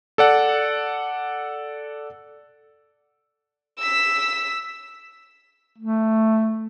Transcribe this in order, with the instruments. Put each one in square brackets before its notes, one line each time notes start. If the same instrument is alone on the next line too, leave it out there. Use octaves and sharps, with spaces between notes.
[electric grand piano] A4 D5 F#5
[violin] E6 B6
[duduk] A3